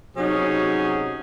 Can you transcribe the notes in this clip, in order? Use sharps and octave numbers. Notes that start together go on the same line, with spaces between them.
C3 F#3 C#4 D#4 G#4